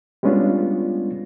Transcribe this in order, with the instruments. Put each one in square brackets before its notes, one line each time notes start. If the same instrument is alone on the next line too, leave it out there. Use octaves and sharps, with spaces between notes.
[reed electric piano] G3 G#3 B3 C#4 D4 F4